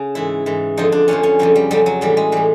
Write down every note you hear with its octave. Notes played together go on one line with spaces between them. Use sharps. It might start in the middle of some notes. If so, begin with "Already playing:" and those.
Already playing: C#3
G#2 E3 E4
G#2 E3
F2 D3 F3 D#4
D4
F2 D3 F3 C#4
C#4
F2 C#3 F#3 G3
G3
F2 C#3 F#3 G3
F#3
A2 E3 G3
G#3
A2 E3 G3